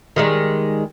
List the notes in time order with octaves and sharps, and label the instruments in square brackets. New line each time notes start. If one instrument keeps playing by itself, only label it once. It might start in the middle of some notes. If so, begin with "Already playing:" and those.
[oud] D#3 G3 G#3